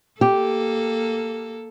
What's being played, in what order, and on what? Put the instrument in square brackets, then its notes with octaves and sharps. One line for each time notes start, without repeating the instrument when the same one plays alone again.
[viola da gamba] A#3 A4 [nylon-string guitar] G4